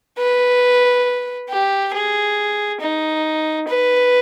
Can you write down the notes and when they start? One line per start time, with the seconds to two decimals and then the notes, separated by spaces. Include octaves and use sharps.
0.19 B4
1.50 G4
1.93 G#4
2.80 D#4
3.68 B4